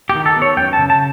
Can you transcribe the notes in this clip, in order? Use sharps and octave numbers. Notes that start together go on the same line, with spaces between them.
G4
D#3
A4
B3
C#5
F#2 G5
A5
C#3
A5